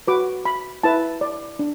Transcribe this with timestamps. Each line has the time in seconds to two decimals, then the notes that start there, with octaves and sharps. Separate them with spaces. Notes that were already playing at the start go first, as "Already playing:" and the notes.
0.07 F#4 B4 D6
0.45 B5
0.83 E4 B4 A5
1.21 D5
1.59 D4